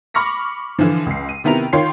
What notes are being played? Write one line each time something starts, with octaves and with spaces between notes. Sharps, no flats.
B5 C#6 D6 F6 A#6 C#7
D3 E3 F3
C#2 C7
D#7
C3 D#3 B3 E4 A#4 F7
D#3 F4 C#5 G5 C6 C7